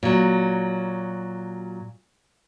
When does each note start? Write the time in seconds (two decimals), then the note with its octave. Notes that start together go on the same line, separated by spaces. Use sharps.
0.03 A#2 F#3